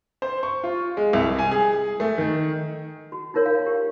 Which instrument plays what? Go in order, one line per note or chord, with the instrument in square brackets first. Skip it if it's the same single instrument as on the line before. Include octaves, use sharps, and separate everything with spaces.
[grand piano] C5
C#6
F4
G#3
C2
G#5
G#4
A3
D#3
[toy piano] F#4
D#4 F4 A#4 C#5
F5
G4